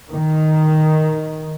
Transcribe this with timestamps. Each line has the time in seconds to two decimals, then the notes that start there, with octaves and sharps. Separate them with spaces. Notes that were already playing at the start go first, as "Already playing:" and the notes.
0.11 D#3